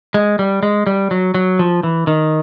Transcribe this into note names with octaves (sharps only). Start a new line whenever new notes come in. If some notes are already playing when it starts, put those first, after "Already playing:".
G#3
G3
G#3
G3
F#3
F#3
F3
E3
D#3